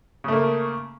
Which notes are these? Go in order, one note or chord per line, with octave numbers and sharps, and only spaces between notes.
C#3 A3 A#3